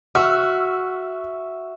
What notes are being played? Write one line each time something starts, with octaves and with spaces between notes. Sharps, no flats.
F#4 E5 C#6 E6 F6